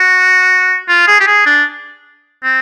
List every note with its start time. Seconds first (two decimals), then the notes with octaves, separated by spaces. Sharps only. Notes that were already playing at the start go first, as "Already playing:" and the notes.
Already playing: F#4
0.89 F4
1.07 G#4
1.20 G4
1.27 G#4
1.46 D4
2.43 C4